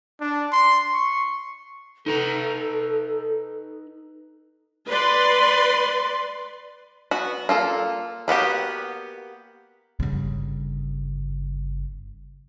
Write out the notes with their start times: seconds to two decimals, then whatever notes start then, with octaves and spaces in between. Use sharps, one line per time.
0.20 D4
0.52 C6
0.93 C#6
2.06 D#4 A4 B4 A#5
4.89 B4 D5 C6
7.11 B3 F#4
7.49 A#3 F4 A4
8.28 A#3 B3 F#4 G4
10.00 G1 C#3